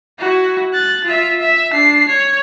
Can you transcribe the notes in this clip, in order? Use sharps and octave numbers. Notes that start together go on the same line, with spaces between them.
E4 F#4
F#6 A6
F4 E5
E5
D4 C7
C#5